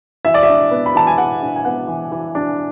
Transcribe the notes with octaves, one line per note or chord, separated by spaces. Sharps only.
E3 E5
D5
E5
D4
B3
B5
E3 A5
G#5
E3 F#5
D4
G#5
B3 F#5
E3
E3
D4